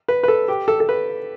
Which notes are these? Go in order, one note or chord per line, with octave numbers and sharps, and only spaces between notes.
B4
B4
A4
G4
A4
A4
B4